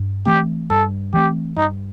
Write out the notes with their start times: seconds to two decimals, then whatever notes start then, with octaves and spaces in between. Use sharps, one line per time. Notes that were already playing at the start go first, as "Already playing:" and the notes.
Already playing: G2
0.26 E3 A3 C4 G4
0.70 G2 A4
1.13 E3 A3 C4 G4
1.56 G2 D#4